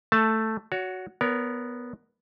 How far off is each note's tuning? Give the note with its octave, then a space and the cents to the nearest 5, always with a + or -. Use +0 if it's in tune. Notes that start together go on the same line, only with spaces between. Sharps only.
A3 +5 A5 +0
F#4 +0 C#5 +30
B3 +0 A#4 +0 C#5 +35